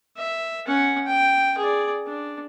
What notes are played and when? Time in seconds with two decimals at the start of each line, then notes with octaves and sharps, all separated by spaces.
0.17 E5
0.67 C#4 F#5
1.06 G5
1.58 G#4 D5
2.07 D4